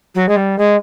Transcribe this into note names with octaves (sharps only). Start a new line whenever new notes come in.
F#3
G#3
G3
G#3